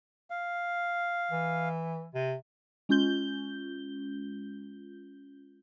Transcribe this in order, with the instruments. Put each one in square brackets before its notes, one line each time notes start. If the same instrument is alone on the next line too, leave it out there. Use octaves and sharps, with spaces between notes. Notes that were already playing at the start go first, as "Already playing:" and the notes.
[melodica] F5
[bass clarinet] E3
C3
[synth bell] G#3 C#4 F4 G6 G7